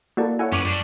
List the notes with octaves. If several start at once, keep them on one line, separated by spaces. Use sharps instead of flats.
A#3 E4 F#4 A4 A#4 D5
E4 A4 C#5 E5 F#5 G#5
F#2 C#4 B4 C#6 D6
G3 D4